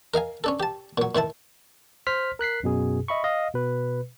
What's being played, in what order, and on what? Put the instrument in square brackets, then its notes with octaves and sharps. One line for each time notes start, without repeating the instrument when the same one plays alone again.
[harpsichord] A#4 D#5 F5 G#5
C#4 D4 A4
G4 A5
A#2 F#3
A2 D#3 E4 A5
[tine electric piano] C5 C6 F6 B6
A#4 F#6 B6 C7
F#2 B2 G#4
D#5 E5 B5 C#6
D#5 F5
B2 B4